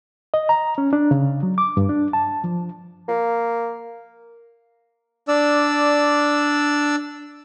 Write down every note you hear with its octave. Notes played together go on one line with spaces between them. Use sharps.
D#5
A#5
C#4
D4
C#3
F#3
D6
G2
D4
A5
F3
A#3
D4 D5 E6